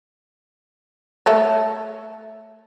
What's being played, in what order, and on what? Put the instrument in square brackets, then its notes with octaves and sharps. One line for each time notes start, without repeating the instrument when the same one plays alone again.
[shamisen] A3 A4 C#5